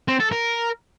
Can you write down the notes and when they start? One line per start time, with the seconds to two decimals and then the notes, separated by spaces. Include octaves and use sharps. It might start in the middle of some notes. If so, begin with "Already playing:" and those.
0.08 C4
0.20 A4
0.31 A#4